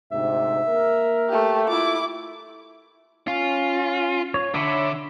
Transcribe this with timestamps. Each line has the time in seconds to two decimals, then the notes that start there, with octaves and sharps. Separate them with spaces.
0.12 D2 G#2 C3 E5
0.68 A#3 A#4
1.29 A3 G4
1.68 E4 F4 D6
3.28 C#4 F4
4.34 C#5
4.54 D3 C#5 E5 B5